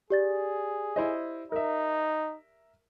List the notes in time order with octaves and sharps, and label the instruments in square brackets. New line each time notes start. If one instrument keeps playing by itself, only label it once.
[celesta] G4 D5 A6 [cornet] G#4
[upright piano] E4 C5 D#5
[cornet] D#4 [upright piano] A#4 E5